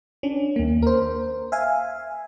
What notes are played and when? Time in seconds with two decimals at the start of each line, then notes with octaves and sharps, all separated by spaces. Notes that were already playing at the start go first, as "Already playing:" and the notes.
0.23 C#4 D4
0.56 D#2 A#3
0.82 A#4 C5
1.52 E5 F5 G#5